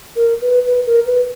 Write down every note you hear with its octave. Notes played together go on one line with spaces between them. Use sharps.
A#4
B4
B4
A#4
B4